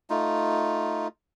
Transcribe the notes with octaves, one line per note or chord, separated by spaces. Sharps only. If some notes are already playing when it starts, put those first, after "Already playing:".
A3 D#4 F4